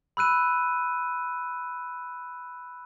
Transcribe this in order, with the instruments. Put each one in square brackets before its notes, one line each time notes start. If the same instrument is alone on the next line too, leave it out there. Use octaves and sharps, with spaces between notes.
[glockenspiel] B5 E6 F#6 D#7